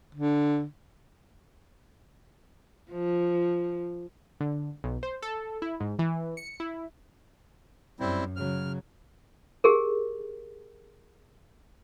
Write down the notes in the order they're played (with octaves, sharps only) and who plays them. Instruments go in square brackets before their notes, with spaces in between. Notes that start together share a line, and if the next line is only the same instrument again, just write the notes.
[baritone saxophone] D3
[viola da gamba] F3
[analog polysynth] D3
B1
C5
A4
E4
G#2
E3
C#7
E4
[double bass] F#2 [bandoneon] G3 C4 E4
[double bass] C#3 F#3 [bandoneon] F6
[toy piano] G4 G#4 A#4